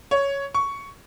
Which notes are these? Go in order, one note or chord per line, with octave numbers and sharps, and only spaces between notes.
C#5
C#6